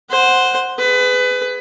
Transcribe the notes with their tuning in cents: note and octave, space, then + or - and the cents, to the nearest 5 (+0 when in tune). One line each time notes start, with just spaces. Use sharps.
C5 +0 F#5 +0
G#4 +0 B4 +25